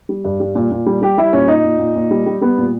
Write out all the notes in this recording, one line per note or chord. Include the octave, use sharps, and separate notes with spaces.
G3
G2
G3
A#2
A#2
G3
G3 G4
G3 E4
A#2 C#4
A#2 D#4
A#2
A#2
A#2
G3
G3
G3 B3
A#2